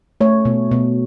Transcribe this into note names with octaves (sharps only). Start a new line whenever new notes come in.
A3 C#5
B2
B2